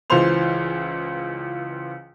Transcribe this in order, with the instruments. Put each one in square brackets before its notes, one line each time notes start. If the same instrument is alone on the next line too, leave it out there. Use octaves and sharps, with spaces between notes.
[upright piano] C#2 E3 F4 C5 C6 F7